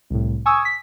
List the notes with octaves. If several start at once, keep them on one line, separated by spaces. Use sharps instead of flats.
C2 A2
G#5 C#6 D#6 E6 G#6
B6